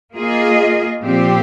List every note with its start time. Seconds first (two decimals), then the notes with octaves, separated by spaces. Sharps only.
0.15 A#3 F4 G#4 D#5
1.02 A#2 F3 C4 G4